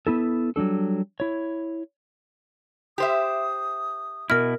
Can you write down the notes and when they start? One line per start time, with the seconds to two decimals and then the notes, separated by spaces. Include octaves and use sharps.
0.07 B3 E4 A4
0.56 F#3 G3 D4 A4
1.20 E4 C#5
2.98 G4 C5 E5 D#6
4.30 B2 E4 A#4 F6